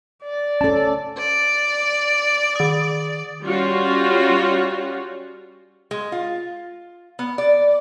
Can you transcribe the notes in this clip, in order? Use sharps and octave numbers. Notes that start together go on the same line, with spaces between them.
D5
C#4 A4 A5
D5
D#3 D#6
G3 C#4 F4 F#4
G#3
F4
B3
D5